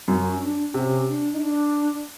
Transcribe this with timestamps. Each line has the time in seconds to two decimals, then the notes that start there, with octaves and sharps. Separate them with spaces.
0.08 F#2 F#4
0.31 C#4
0.42 D4
0.74 C3 C#4
1.08 D4
1.33 D#4
1.41 D4